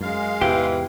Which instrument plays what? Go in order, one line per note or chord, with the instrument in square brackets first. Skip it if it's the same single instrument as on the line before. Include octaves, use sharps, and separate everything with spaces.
[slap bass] F#2 [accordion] G#3 F5
[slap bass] E2 G#2 C3 [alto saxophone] E3 [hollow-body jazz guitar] G4